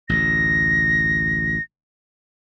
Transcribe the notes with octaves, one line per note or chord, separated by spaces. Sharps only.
A1 D2 A#6